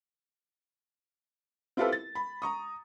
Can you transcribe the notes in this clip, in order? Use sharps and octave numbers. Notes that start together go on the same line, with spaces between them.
C4 E4 F4 G4 A4 B4
A6
B5
A#5 C#6 D#6